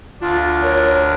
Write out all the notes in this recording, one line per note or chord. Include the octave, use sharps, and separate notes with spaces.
D2 D4 F4
A#4 C#5